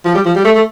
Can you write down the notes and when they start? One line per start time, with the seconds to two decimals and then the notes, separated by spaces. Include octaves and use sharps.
0.05 F3
0.15 G3
0.26 F3
0.35 G3
0.45 A3
0.55 A3